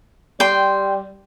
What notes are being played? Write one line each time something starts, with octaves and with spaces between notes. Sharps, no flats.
G3 G5 C6